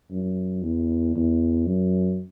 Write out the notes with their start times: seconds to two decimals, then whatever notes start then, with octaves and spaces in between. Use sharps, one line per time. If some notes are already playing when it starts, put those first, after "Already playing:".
0.11 F#2
0.63 E2
1.15 E2
1.66 F#2